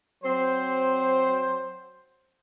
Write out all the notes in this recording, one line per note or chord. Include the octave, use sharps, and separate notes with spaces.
F#3 C4 C5